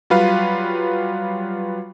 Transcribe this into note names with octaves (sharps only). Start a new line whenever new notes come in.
F#3 G3 F4 B4 F5